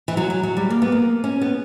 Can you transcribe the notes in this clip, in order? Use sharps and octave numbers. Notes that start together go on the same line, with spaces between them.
E3
F#3
F#3
F#3
G3
A#3
B3
A#3
C#4
B3